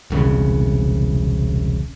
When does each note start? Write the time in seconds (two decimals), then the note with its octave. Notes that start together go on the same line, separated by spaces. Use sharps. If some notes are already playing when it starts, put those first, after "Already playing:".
0.10 E1 C2 C#3